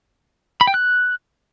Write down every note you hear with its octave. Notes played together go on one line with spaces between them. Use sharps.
B5
G5
F#6